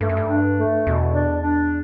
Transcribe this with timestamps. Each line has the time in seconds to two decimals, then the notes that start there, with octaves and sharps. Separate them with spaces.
0.01 G2 A3
0.09 F#2
0.17 G2
0.30 D4
0.58 A3
0.86 E2 B2
1.14 D4
1.43 D4